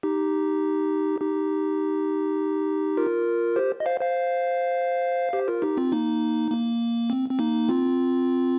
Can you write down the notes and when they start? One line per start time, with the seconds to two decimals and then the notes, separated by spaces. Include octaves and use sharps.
0.03 D#4 G4
1.20 D#4 G4
2.97 F4 A#4
3.56 G4 C5
3.80 D#5
3.86 C5 F5
4.01 C5 F5
5.33 G4 C5
5.48 F4 A#4
5.62 D#4 G4
5.77 C4 F4
5.92 A#3 D#4
6.51 A#3
7.10 C4
7.30 C4
7.39 A#3 D#4
7.69 C4 F4